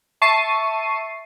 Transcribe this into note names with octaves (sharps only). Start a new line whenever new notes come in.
E5 A5 C#6 C7 D#7